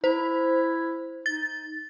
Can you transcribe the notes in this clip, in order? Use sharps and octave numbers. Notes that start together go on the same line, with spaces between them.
E4 C5
D#4 A6